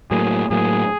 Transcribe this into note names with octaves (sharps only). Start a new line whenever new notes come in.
A2 F#3 A#3 G#4
A2 F#3 A#3 G#4